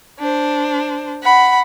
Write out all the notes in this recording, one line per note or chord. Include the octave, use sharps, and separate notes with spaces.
D4 C5
F#5 B5